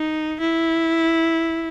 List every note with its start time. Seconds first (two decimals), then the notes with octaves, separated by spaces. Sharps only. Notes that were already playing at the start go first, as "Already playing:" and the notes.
Already playing: D#4
0.41 E4